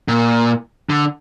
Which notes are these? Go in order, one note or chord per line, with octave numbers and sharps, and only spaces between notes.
A#2
D3